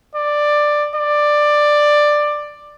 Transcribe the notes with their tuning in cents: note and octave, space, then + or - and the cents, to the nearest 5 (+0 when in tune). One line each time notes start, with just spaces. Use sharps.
D5 +10
D5 +10